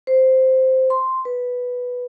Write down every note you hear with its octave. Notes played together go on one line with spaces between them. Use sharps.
C5
C6
B4